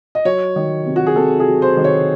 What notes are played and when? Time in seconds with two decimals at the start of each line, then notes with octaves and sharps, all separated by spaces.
0.15 D#5
0.25 F#3 C#5
0.56 D#3
0.86 C3
0.96 F#4
1.06 G#4
1.16 C3 A4
1.40 G#4
1.48 F#3
1.62 C5
1.77 D#3
1.84 C#5